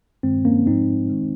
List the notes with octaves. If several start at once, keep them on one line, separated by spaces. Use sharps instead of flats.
G2 D#3 G#3 C4
A#3 C#4
G#2 F3 G#3 C4 D#4
D#3 G#3